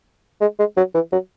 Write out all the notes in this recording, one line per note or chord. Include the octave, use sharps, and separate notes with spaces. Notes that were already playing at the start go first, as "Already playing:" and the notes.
G#3
G#3
F#3
E3
F#3